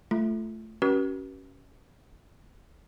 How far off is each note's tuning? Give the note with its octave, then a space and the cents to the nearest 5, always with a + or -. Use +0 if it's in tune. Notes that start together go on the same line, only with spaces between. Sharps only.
A3 +0 F4 -25
C#4 +0 F#4 +45 B4 -45